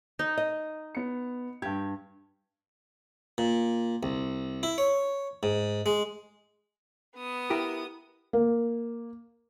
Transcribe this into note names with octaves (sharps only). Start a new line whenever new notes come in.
D#4
D#5
B3 C#7
G2 G4 G#6
A#2
C2
E4
C#5
G#2
G#3
B3 D#6
E4 G4 A#4
A#3